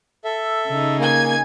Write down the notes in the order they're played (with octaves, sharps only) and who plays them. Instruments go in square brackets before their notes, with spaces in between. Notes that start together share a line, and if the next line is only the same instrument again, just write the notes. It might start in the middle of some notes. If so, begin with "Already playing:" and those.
[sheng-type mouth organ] A4 E5
[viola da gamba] C#3 D#4
[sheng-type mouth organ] A#3 [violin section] G#5 G#6